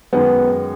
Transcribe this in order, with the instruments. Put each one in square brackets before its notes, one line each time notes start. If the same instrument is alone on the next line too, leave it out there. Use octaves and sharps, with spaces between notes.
[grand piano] F#2 D#3 G#3 D#4 G#4 [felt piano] B3